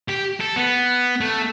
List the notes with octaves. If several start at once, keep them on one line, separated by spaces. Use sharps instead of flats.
G4
A4
B3
A3